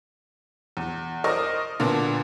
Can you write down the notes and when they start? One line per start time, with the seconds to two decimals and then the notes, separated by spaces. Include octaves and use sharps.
0.77 E2
1.24 A#4 C5 D5 D#5 C#6 D#6
1.80 A#2 D3 B3 D4